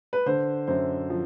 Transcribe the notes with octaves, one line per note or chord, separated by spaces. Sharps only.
B4
D3 C5
F#2 C5
F3